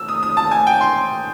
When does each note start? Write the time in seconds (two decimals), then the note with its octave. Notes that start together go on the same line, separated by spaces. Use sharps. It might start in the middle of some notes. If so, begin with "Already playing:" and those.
Already playing: E6
0.08 D#6
0.23 D#6
0.37 A5
0.51 G#5
0.67 G5
0.81 C6